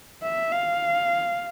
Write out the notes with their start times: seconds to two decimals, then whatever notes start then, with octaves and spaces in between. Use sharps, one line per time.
0.23 E5
0.52 F5